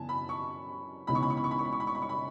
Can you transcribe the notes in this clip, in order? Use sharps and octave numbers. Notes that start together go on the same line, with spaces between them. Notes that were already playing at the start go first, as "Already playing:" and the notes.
Already playing: F#2 C#3 E3 B3 G#5 A5
B5
C#6
C#2 C#3 E3 B3 D#4 B5
C#6
B5
C#6
B5
C#6
B5
C#6
B5
C#6
B5
C#6
B5
C#6
B5